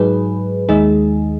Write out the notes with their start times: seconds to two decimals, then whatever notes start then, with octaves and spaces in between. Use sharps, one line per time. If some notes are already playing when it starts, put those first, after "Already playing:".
Already playing: G#2 F#3 D#4 G#4 B4
0.69 D#2 D#3 G#3 D#4 G#4